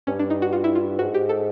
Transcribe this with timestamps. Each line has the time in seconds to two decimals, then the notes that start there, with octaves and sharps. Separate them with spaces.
0.07 G2 C#4
0.19 D4
0.30 D#4
0.42 F#4
0.53 F4
0.64 E4
0.75 F4
0.99 G#2 F#4
1.14 G4
1.29 A4